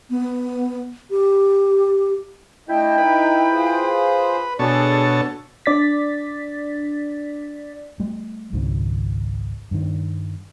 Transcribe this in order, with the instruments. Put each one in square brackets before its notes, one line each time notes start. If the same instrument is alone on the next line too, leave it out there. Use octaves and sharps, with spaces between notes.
[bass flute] B3
G4
[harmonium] A3 D4 D#5 [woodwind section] E4 G5
[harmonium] D#4 [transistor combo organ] B4
[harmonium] F4 G#4 C5
[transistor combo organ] B2 C#5 A5 [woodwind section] D4 F#4 A4 [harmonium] G#4 D5
[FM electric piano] D4 D5 A6 B6
[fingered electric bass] G3 A3
G#1 C#2 G#2 D#3
G2 D#3